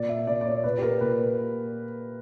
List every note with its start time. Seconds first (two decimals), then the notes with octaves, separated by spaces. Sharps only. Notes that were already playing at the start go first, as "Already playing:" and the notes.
Already playing: A#2 D5
0.09 E5
0.27 A#2 D5
0.41 D5
0.46 C#5
0.64 A#2 B4
0.78 G4
0.82 A#4
1.01 A#2 B4